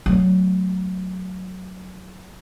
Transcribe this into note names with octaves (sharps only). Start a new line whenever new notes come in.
F#3 A3